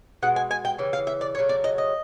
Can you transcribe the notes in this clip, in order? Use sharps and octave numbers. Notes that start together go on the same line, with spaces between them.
B2 G#3 F#5
G#5
G#5
G5
C#3 E3
F5
E5
D5
C#3 F#3 A3 C#5
D5
D#5
D#5